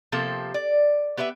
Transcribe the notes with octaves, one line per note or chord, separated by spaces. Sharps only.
C3 F3 A#3 G4 A4
D5
B3 G4 B4 D#5 E5